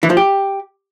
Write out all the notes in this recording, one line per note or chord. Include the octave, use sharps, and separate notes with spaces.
E3
F3
G4